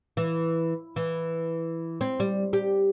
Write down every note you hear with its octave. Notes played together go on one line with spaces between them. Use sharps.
E3
E3
C4
G3
G4